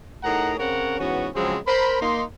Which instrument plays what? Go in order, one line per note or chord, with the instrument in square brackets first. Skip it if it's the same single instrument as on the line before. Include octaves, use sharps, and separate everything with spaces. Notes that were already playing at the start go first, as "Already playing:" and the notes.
[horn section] A2 D#4 G#4 A#4 F#5 A#5
C#3 C4 C#4 A#4 C#5 F#5
G#2 E3 B3 C#4 F#4
C#3 F3 F#3 G#3 C4
A#4 C5 B5
A#3 D#4 C6